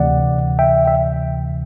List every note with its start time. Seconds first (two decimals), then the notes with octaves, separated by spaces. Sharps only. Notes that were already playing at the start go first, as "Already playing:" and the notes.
Already playing: D2 C3 E3 D5 F#5
0.59 E5 G5
0.87 E5